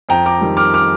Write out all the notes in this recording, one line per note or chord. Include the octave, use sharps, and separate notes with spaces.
F2 G5 A#5
A#5 D6
D#3 G3
D6 F6
D6 F6